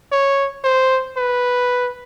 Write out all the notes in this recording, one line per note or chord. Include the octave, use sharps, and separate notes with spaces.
C#5
C5
B4